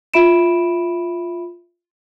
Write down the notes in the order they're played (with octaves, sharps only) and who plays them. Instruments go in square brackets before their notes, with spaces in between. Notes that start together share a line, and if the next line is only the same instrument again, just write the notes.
[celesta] F4 E5 B5 D7 E7